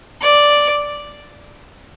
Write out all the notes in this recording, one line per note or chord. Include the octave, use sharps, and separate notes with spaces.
D5